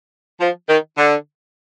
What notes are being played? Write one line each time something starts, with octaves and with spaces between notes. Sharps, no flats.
F3
D#3
D3